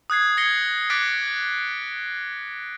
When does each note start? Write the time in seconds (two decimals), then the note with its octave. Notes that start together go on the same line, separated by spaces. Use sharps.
0.10 D#6 F#6 G#6 C7
0.37 G#6 A#6 C7 C#7 G7
0.90 D6 D#6 F#6 A6 B6 D7